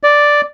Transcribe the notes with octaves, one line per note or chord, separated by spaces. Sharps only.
D5